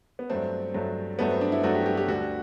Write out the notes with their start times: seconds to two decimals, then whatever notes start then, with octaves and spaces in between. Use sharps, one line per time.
0.19 B3
0.30 G2 F#3 A3 C4
0.74 G2 F#3 A3
1.19 G2 F#3 A3 B3
1.31 C4
1.41 D4
1.52 E4
1.63 G2 F#3 A3 F#4
1.75 G4
1.86 G4
1.97 G4
2.08 D2 D3 G3 F#4